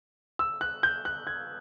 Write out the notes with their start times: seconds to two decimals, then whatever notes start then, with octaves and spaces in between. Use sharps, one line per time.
0.39 E6
0.61 F#6
0.83 G6
1.05 F#6
1.27 G#6